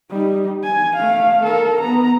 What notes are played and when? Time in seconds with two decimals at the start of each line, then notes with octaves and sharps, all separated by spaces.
0.11 G3 D#4
0.64 G#5
0.96 A3 F5
1.44 A4 A#4
1.81 B3 A#5